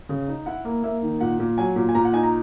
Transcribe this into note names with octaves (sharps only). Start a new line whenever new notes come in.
C#3
D#4
E4 F#5
A#3
A#3 E5
D#3
A#2 F#5
A#2
F#3 G#5
A#2
G#5
A#2 A#5
F#5
D#4 G#5
A#5